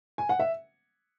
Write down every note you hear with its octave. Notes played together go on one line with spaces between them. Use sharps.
G#5
F#5
E5